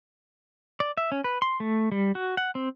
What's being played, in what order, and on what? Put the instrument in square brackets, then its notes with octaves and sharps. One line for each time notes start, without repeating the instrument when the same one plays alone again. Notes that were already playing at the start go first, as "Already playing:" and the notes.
[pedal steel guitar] D5
E5
C#4
B4
C6
A3
G3
F#4
F#5
C4